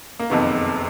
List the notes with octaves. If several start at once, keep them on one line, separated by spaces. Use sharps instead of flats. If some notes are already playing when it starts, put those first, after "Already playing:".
A#3
F#1 F2 C3 D#3 B3